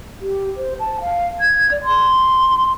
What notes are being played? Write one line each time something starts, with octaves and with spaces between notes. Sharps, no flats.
G4
C5
A5
F5
G#6
D5
C6